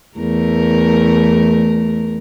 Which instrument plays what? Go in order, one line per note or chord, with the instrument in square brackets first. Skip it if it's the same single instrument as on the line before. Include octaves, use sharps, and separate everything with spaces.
[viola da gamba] E2 A3 A#4